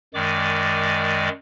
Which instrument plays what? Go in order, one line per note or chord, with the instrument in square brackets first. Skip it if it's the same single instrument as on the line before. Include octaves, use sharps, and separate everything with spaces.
[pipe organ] F#2 D#3 G#3 D5 D6